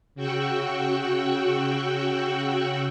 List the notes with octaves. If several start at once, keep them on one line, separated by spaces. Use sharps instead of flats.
C#3 F#4 G5 C#6 E6 F#6